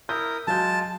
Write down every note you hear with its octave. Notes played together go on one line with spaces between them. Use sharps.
E4 A#4 D#6 G6
F#3 G#3 F4 A5 G6